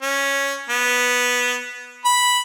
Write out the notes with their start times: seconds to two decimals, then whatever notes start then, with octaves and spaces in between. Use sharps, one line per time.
0.02 C#4
0.69 B3
2.05 B5